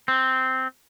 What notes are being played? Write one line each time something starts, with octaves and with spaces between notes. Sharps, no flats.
C4